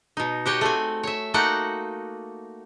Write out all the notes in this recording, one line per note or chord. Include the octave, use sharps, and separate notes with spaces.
B2 D#4
F#4 G4 C#5 D#5
A3 C4 G#5
C#5 E5
A3 A#3 D#4 F#4 F#5 G5